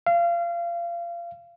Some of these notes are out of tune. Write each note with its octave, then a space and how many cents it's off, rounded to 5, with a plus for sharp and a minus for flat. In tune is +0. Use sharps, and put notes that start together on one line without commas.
F5 -30